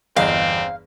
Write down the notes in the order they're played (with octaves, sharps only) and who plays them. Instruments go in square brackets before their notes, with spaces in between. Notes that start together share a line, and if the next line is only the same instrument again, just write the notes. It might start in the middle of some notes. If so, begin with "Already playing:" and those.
[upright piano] G1 E2 D#5 [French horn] C4 [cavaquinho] F5